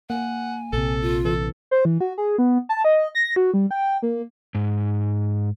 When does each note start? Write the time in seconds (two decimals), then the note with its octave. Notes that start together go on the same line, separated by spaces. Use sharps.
0.10 A#3 F#5 G#5
0.73 A#1 C3 A4
1.02 F4
1.25 E3 A4
1.71 C5
1.85 E3
2.00 F#4
2.18 G#4
2.38 B3
2.69 A5
2.85 D#5
3.15 A#6
3.36 F#4
3.54 G3
3.71 G5
4.02 A#3
4.55 G#2